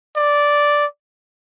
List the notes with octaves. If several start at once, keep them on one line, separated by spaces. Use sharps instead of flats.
D5